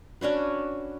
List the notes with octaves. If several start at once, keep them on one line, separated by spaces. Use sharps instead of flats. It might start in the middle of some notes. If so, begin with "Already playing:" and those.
C#4 D4 F#4 B4